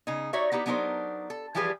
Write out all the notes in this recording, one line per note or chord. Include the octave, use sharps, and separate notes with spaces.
C#3 D#4
D#4 F#4 C#5 D5 E5
B3 D#4 E4 G4
F#3 B3 D4 D#4 A#4 C5
A4
E3 F3 G3 G4 G#4 B4